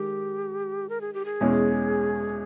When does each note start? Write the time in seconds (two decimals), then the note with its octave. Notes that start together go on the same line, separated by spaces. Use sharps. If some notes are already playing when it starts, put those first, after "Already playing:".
Already playing: D#3 G#3 G4
0.89 A#4
1.01 G#4
1.14 G4
1.25 G#4
1.41 E2 B2 G#3 C#4